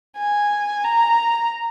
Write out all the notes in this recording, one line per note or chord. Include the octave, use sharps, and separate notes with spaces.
G#5
A#5